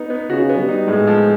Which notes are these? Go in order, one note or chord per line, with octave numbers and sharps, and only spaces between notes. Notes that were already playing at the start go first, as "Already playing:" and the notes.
Already playing: B3 D#4
B3
C#3 F#4
B3
G3
D#4
A2 G#3
F3